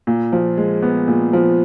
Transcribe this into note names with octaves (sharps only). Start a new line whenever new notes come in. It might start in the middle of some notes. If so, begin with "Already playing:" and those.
A#2
F3
G#3
B3
A#2
F3